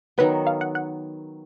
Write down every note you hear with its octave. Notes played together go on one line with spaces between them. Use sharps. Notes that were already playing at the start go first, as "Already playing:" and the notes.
D#3 F#3 B3 B4
F5
F#5
F#5